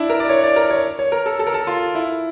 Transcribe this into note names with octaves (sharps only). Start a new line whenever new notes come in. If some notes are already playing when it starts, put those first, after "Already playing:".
Already playing: D4 E4
A#4
D5
C#5
D5
A#4
C#5
C#5
A#4
A4
A4
A#4
A4
F4
E4